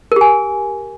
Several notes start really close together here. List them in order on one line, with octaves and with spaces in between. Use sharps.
A#4 G4 G#5